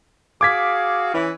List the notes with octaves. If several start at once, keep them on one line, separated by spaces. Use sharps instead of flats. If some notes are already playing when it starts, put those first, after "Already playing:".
F#4 G#4 F5 D6 G#6 B6
E3 C#4 E4